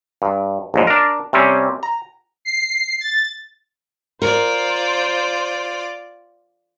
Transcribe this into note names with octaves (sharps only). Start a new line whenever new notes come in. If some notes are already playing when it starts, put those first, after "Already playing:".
G2
A#1 D#2 G#2
D4 A#4
C3 G3 C4 C#4
A#5
C7
A6
F4 A#4 C5 D5